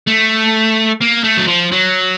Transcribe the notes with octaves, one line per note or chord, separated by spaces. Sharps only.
A3
A#3
A3
F#3
F3
F#3